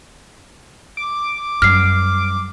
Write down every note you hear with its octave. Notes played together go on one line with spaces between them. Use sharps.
D6
F#2 G3 F6 C7